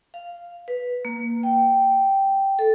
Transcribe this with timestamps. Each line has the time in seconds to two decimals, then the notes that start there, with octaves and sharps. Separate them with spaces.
0.14 F5
0.68 B4
1.05 A#3
1.43 G5
2.59 A4